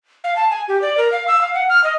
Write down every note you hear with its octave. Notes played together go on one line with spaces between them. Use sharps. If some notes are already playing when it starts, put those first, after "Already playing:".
F5
A5
G#5
G4
D5
A#4
F5
E6
F5
F#5
F6
D#5